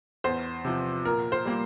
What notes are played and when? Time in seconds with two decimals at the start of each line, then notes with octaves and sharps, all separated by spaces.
0.24 E2 C5
0.65 C3 F3
1.05 A#2 A#4
1.32 C5
1.45 G3 A#3